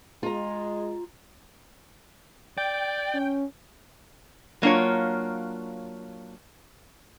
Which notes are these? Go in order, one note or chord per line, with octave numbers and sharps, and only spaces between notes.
G#3 F4 A#5
D5 G5
C#4
F#3 A#3 D4 F4 C#5